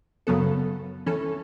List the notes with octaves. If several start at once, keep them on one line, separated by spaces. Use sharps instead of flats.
F#2 C#3 F#3 B3 A4
E3 C#4 A4